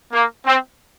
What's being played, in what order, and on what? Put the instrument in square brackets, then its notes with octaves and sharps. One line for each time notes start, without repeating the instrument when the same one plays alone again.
[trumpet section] A#3
C4